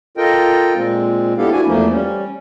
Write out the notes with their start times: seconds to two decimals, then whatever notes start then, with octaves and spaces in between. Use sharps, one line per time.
0.17 F4 A4 A#4 D#5 G5
0.75 A#2 G#3 C4
1.38 B3 D4 E4 G4 A4 F5
1.52 D4 E4 F#4 G#5
1.67 E2 F3 A3 A#3
1.91 G3 C#4